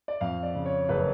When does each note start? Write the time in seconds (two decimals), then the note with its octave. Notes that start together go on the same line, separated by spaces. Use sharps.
0.08 D5
0.21 F2 F5
0.43 D5
0.55 C#3
0.66 C#5
0.89 F#1 B4